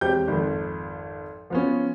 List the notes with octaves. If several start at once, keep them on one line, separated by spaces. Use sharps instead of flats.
E1 C4 G4 G6
G#1 F2
F3 B3 C#4